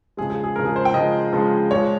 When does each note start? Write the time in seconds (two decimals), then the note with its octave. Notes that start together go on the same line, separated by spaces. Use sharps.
0.17 C#3 F3 G#3 G#4
0.30 G#4
0.44 G#4
0.56 C#3 F3 G#3 A#4
0.65 G#4
0.76 C5
0.85 G5
0.94 C#3 F3 G#3 D#5
1.33 C#3 F3 G#3
1.71 A#2 F3 G#3 C#5